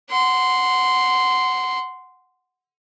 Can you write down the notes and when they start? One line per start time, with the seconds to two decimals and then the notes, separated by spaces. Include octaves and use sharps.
0.11 F#5 C6